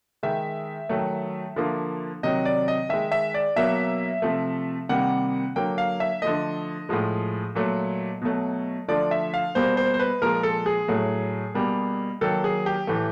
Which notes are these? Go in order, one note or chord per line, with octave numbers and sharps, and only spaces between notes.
D#3 G#3 E5
D#3 F#3 A3
D3 F3 A#3
C3 D#3 F#3 D#5
D5
D#5
D#3 G#3 E5
E5
D5
B2 F#3 A#3 E5
C3 F3 A3
C3 D#3 G3 A#3 F#5
D3 F#3 A#3 G5
F5
E5
D3 F3 A3 D#5
A2 F3 G#3
A#2 F#3 A3
B2 F#3 A3
D3 F3 A3 D5
E5
F5
B2 G3 A#3 C5
C5
C5
B4
A#2 F3 G#3 A#4
A4
G#4
A2 F#3 A3
B2 G3 A#3
D#3 F#3 A#3 A4
G#4
G4
A2 E3 A3